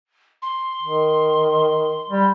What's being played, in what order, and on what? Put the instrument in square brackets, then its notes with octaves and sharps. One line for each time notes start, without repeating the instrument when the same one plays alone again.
[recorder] C6
[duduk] D#3
G3